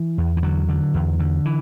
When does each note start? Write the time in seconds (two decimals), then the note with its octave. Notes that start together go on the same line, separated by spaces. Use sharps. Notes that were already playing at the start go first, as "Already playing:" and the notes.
Already playing: E3
0.18 E2
0.37 E3
0.43 D3 F#3
0.69 D3
0.94 E2
1.19 D3
1.45 E3